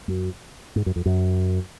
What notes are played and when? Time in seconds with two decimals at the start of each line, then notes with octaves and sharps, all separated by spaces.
0.08 F#2
0.76 G#2
0.86 F#2
0.96 F2
1.06 F#2